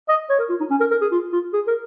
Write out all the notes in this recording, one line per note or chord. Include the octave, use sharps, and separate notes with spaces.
D#5
C#5
A#4
F4
D#4
C#4
A#4
A#4
G#4
F4
F4
G#4
A#4